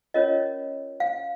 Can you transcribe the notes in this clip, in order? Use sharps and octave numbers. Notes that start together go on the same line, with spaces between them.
C#4 F4 A#4 C#5 D#5
F5